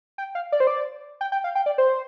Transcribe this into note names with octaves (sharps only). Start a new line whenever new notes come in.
G5
F5
D5
C5
D5
G5
G5
F5
G5
D5
C5